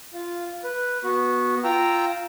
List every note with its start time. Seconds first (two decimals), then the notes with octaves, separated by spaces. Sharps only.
0.14 F4
0.64 B4
1.04 B3 F#4
1.64 F4 G5 A#5 E6